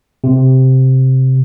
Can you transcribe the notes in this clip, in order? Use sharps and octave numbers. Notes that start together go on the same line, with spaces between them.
C3